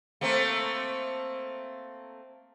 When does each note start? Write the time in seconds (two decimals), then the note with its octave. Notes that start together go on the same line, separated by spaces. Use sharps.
0.21 A3 A#3 C4